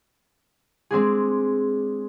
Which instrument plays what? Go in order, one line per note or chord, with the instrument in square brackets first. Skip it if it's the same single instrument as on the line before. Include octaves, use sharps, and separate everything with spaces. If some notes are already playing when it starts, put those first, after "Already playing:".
[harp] G#3 C4 D4 G#4